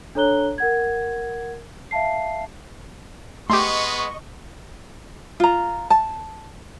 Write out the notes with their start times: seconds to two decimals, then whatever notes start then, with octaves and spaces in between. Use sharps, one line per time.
0.15 D4 A4 C#5 A#5 F#6 G7
0.58 A#4 F#5 G#6
1.91 E5 F5 A5 C7
3.50 G#3 A3 B3 G4 D#5 C6 C#6
5.40 F4 A#5
5.90 A5